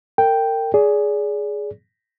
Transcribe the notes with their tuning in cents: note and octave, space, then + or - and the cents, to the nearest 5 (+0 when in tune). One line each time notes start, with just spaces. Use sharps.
A#4 -35 G5 +0
G#4 +5 D5 -25